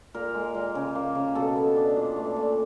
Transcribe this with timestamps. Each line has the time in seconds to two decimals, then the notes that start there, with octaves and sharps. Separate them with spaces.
0.14 A#2 A#4
0.34 G#3
0.55 A#2
0.75 C#3
0.95 A#3
1.15 C#3
1.35 B2 A4
1.56 B3
1.76 D4
1.96 A#2
2.16 A3
2.36 A#2